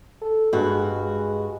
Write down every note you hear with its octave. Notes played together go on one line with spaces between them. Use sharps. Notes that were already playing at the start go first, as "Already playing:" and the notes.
A4
G2 G#3 F#4
G#3